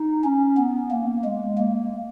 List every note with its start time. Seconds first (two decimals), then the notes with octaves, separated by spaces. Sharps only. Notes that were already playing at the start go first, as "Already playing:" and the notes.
Already playing: D#4
0.24 C#4
0.58 B3
0.91 A#3
1.24 G#3
1.58 A#3